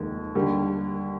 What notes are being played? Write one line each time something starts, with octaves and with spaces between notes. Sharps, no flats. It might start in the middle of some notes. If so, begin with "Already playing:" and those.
Already playing: F1 D#2 D#3 G#3
D#2 D3 G3